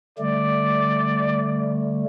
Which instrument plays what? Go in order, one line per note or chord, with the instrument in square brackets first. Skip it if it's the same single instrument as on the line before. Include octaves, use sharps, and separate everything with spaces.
[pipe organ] D3 G3 A3 [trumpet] D5